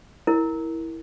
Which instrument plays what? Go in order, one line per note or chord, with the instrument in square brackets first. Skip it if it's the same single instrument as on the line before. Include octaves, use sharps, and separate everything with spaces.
[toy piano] E4 A#4